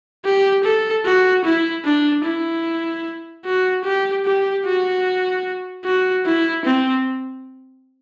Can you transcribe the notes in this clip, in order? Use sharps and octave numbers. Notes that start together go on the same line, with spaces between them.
G4
A4
F#4
E4
D4
E4
F#4
G4
G4
F#4
F#4
E4
C4